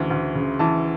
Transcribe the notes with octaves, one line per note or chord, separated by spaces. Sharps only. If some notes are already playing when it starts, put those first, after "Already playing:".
Already playing: D2 C#3 E3
D2
C#3
E3 A5